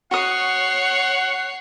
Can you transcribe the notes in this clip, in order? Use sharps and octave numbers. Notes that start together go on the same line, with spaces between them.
F#4 C#5 F#5 D#6 C7